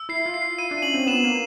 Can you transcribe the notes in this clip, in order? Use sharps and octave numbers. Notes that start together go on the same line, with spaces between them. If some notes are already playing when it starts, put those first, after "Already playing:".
Already playing: E6
E4 C7
F4
C7
F4
E4 D#7
D4
C#4 F#7
C4
B3 E7
A#3